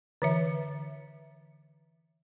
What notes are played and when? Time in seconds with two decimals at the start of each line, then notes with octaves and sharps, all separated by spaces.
0.22 D3 E3 E5